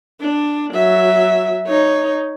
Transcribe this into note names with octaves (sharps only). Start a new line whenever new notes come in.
D4
F#3 E5
D#4 C#5